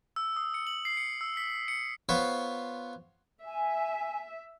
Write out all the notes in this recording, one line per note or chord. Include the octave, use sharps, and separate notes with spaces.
E6
D#6
C#7
F#7
C7
C#7
E6
B6
C#7
B3 F4 C5 C#5 B5
E5 G#5